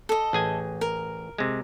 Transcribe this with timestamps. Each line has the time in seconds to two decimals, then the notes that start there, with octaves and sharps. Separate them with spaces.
0.09 A4 D#5
0.33 A1 G#4 G#5
0.81 A#4
1.38 C3 G#3